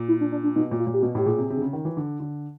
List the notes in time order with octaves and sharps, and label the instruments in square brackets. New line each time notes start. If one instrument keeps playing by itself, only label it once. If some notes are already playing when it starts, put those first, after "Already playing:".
Already playing: [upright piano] A#2
[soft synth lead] E4
D4
D4
D4
[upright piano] B2 [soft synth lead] D#4
[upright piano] A#2
[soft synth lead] F4
[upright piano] A#2
[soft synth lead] G4
[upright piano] B2 [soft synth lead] F#4
[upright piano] A2 [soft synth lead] G4
[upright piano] A#2 [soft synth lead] G#4
[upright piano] C3
C3
D3
C#3
D#3
E3
D3
D3